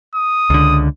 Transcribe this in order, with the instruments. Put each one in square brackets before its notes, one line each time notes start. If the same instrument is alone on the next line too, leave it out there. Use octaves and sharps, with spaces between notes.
[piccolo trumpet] D#6
[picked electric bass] C#2 D3